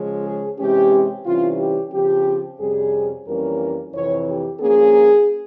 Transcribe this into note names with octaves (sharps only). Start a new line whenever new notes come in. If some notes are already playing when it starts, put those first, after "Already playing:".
Already playing: C#3 F3 G#3 C#4
G#4
C3 E3 G#3 C#4 G4
C3 E3 G3 C#4 F4
G4
C#3 F3 C4 G4
F2 C3 G3 C#4 G#4
F2 E3 G3 A#3 C#4 A#4
F2 C3 E3 C#5
G4
G2 F3 A#3 C#4 G#4